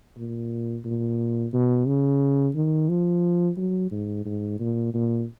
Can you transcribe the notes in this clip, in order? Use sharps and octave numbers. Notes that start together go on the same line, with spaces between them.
A#2
A#2
B2
C#3
D#3
F3
F#3
G#2
G#2
A#2
A#2